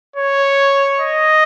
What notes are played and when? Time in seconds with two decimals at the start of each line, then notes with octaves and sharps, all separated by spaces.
0.16 C#5
1.00 D#5